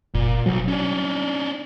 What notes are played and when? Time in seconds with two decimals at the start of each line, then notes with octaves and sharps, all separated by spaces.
0.14 F#1 A#2
0.46 B1 F#3
0.68 C#4 D4